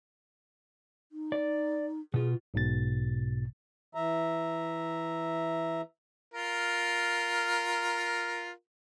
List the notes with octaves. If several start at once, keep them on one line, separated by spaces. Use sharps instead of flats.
D#4
D5
B2 F4 G#4
B1 G#2 B2 A6
E3 E5 A#5
F4 A#4